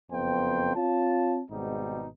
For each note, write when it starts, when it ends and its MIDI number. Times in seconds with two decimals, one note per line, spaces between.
0.12 0.73 30
0.12 0.73 41
0.12 0.73 59
0.12 0.73 72
0.12 0.73 79
0.75 1.41 60
0.75 1.41 65
0.75 1.41 73
0.75 1.41 81
1.51 2.07 32
1.51 2.07 44
1.51 2.07 47
1.51 2.07 55
1.51 2.07 63